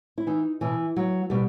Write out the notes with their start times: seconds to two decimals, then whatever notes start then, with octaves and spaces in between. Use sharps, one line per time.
0.18 E4
0.27 E3 D#4
0.61 B2 E3
0.96 F#3
1.30 B2 G3